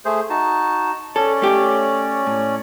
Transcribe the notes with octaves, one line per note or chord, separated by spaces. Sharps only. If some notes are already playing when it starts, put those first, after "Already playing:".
A3 G#4 C5
D#4 F#4 A5
C#4 A4 C#5 D5
A3 G4
A2